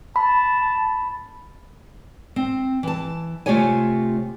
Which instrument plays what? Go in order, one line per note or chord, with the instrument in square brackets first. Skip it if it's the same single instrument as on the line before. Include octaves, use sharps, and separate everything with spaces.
[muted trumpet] A5 [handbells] B5
[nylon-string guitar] C4
E3 A5
C3 A3 F4 G4 C#5 G#5